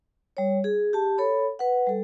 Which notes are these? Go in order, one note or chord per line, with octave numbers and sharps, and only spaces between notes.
G3 C#5
G#4
G4 A5
A4 C#5 B5
B4 F#5
G3 A4